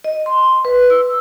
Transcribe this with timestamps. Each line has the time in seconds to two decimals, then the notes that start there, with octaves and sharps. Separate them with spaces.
0.04 D#5
0.26 C6
0.65 B4
0.90 E6